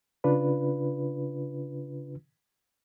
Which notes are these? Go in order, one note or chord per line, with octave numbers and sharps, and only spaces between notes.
C#3 D4 F4 B4